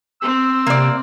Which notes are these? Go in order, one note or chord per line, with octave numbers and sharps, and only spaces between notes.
C4 E6
C3 A#3 D5